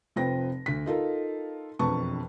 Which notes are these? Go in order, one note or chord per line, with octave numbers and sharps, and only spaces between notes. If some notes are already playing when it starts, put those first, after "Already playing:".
F1 F3 C4 B4 G5 A#6
D2 B6
D#4 F4 A4 A#4
E1 F2 D4 B4 A5 C#6